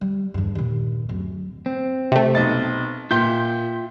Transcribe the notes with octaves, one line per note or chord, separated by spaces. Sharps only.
G3
E2 G2
D#2 A#2
D1 F#2
C4
C3 A3
B1 D#5 A6
A#2 F4 E5 G5 G6